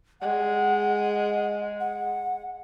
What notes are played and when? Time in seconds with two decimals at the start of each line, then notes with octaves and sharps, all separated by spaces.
0.21 G#3 F#5
1.80 F#5